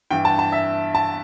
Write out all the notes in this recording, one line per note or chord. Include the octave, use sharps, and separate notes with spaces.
G2 E3 G5
A5
A5
E5
A5